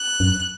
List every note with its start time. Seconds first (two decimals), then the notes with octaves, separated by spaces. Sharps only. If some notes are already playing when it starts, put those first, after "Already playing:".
Already playing: F#6
0.20 F#2